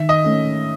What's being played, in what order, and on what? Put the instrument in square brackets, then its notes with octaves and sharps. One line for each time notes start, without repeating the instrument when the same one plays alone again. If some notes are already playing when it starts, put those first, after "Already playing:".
Already playing: [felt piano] D#3 [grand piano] E5
[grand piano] D#5 D#6
[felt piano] A3 C#4